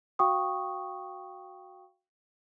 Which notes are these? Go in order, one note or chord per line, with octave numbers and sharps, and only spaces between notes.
F#4 F5 G5 C#6 D#6